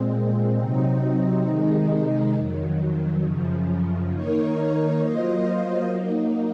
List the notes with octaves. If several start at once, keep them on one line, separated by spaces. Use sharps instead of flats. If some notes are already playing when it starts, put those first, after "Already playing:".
Already playing: A#2 G#3 C4
C3 F#3 C4 D#4
C3 D#3 G#3 D#4
F2 D#3 F#3
F#2 C#3 F3
D#3 A#3 D#4 A#4 C#5
F#3 A#3 F4 C5 D#5
F#3 A#3 D#4